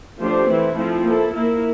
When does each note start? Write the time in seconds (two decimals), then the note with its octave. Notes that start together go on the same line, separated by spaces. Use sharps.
0.20 F3 A3 D4 G4 C5
0.48 E3 A3 C4 E4
0.77 F3 A3 C4 E4
1.05 A#3 E4 A4
1.33 A#3 E4 A#4